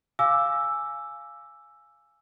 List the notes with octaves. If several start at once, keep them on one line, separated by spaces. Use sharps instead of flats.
F5 G#5 D6 E6